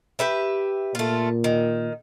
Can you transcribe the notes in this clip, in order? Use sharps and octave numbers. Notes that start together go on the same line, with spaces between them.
G4 B4 E5
A#2 A3 F4
D#3